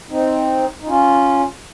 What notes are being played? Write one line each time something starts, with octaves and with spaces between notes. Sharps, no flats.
C4 D#4
D#4
C#4 F4